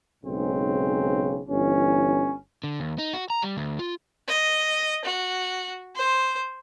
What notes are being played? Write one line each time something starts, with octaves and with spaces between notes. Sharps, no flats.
B1 G#2 C#3 C4
G1 E3 C#4
D3
D#2
D#4
F#4
A#5
G3
D2
F4
D#5
F#4
C5